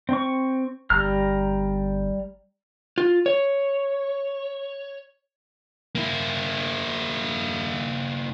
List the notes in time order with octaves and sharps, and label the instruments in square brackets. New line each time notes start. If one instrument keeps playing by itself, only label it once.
[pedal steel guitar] C4 C#6
[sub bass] G1 [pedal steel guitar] G3 A#5 F6
[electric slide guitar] F4
C#5
[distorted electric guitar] A#3 E4